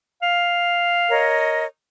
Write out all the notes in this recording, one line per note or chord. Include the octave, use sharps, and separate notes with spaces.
F5
A#4 C#5 D#5